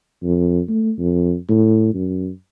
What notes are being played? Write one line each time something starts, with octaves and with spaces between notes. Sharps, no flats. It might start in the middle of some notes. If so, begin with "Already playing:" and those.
F2
A3
F2
A2
F#2